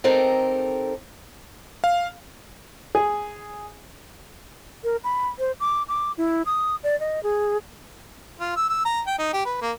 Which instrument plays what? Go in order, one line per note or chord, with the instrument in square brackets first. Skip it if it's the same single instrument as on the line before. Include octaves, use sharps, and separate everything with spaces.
[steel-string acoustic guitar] C4 D#4 G4 A4 A#4
[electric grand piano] F5
[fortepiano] G#4
[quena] A#4
B5
C5
D6
D6
E4
D#6
D5
D#5
G#4
[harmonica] F4
E6
E6
A#5
G5
D#4
G4
B4
A#3